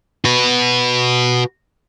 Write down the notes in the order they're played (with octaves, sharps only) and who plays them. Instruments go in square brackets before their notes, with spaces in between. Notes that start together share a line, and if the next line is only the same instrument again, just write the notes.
[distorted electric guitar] F#4 B4